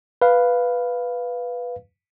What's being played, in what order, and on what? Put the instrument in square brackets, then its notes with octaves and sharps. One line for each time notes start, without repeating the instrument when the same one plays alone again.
[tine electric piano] B4 F5